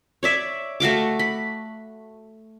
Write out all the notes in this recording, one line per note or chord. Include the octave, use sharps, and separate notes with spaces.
C#5 D5 E5
A3 F#4 F5 D6
B5